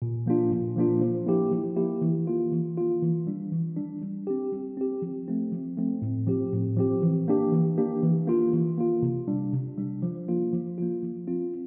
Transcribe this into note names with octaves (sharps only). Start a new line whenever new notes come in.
A#2
F3 A#3 D4 F4
A#2
F3 A#3 D4 F4
F3
A#3 E4 G4
F3
A#3 E4 G4
E3
A#3 F4
E3
A#3 F4
E3
G3 D4
E3
G3 D4
G3
C4 G4
G3
C4 G4
F3
A3 C4
F3
A3 C4
A2
F3 C4 G4
A2
F3 C4 G4
E3
A#3 D4 G4
E3
A#3 D4 G4
E3
A#3 F4
E3
A#3 F4
C3
G3 D4
C3
G3 D4
F3
A#3 F4
F3
A#3 F4
F3
C4 F4